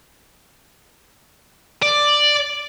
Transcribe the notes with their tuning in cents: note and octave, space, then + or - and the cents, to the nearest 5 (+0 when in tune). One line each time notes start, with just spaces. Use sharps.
D5 +5